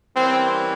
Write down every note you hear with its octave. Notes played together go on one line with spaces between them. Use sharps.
E3 G3 A#3 C4 C#4